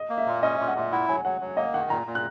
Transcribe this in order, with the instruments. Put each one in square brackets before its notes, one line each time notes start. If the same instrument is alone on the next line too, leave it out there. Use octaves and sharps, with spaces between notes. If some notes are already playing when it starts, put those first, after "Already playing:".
Already playing: [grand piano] D#5
[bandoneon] A#3
[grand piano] E5
[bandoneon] A#2
[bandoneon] C#4 [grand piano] D#5
[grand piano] E5
[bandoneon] A#2
[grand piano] F#5
[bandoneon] A#2 [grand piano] E5
[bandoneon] E4 [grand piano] F#5
[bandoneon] F#3 [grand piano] G#5
[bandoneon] F#3 [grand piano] F#5
[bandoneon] F#3
[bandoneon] A#3 [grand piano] D#5
[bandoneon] D#3 [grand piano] F#5
[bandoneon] A#2 [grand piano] A#5
[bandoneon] A#2
[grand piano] F#6